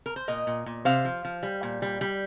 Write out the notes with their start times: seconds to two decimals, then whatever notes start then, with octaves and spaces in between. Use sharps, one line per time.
0.06 A#4
0.16 C5
0.28 A#2 A#4 D#5
0.47 A#2
0.66 A#2
0.85 C3 C5 F5
1.05 F3
1.25 F3
1.43 G3
1.63 A#2
1.82 G3
2.01 G3